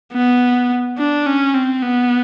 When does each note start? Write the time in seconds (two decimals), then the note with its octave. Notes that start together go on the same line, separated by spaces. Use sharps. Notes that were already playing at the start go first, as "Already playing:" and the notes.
0.13 B3
0.98 D4
1.26 C#4
1.54 C4
1.82 B3